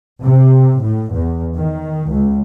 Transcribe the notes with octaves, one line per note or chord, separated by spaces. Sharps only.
C3
A2
E2
D#3
C#2